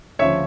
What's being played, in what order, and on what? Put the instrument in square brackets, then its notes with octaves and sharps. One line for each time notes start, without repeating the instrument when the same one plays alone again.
[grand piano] D2 C#3 F3 C#5 E5